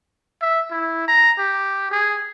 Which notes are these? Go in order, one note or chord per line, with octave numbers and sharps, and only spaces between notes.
E5
E4
A#5
G4
G#4